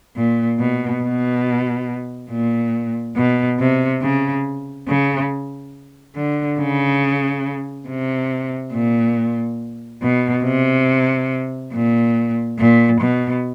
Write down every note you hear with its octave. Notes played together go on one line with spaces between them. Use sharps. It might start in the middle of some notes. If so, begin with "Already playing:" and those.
A#2
B2
B2
A#2
B2
C3
C#3
C#3
D3
C#3
C3
A#2
B2
C3
A#2
A#2
B2